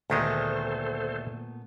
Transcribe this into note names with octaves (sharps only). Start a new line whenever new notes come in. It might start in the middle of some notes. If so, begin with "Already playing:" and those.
D2 A#2 D#3 G#3 A3 B3 A4 C5